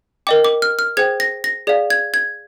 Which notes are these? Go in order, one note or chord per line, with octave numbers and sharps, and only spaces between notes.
A#4 D#5 G5 D6
D6
F6
F6
G#4 C5 G5 G#6
A#6
A#6
G#4 D5 F5
G#6
G#6